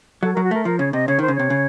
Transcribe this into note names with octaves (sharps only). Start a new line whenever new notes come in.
F#3 A4
F#3 A#4
F#4
A3 A#4
F3 A#4
C#3 C#5
C3 D#5
C#3 C#5
D#3 C5
C#3
C3 C#5
C#3